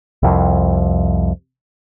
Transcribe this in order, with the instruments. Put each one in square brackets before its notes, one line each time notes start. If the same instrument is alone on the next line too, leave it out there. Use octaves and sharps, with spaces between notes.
[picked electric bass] C2 F2